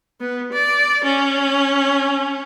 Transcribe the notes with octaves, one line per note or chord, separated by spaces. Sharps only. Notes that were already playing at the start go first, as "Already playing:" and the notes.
B3
D5
C#4